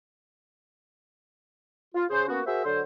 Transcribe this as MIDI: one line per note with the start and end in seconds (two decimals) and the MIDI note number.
1.95 2.05 65
2.10 2.27 49
2.10 2.27 61
2.10 2.27 68
2.10 2.27 72
2.28 2.40 58
2.28 2.40 59
2.28 2.40 61
2.28 2.40 66
2.47 2.64 66
2.47 2.64 68
2.47 2.64 70
2.47 2.64 72
2.47 2.64 76
2.65 2.81 50
2.65 2.81 54
2.65 2.81 69
2.65 2.81 72